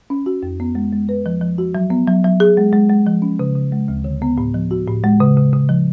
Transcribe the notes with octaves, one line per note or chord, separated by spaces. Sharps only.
C#4
F#4
F2
B3
G#3
G#3
B4
F3
F3
F#4
F#3
B3
F#3
F#3
G#4
G#3
G#3
G#3
F3
C#4
C#3
C#3
G#3
D2
D3
B3
A2
F3
F#4
A2
G#3
C#3
C#3
C#3
F3